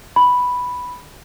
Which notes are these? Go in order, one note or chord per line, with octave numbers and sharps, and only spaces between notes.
B5